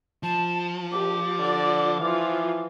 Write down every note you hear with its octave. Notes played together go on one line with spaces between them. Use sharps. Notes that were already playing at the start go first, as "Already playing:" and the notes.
F3 A5
A#1 G4 D6
D3 D5
E3 F3 F4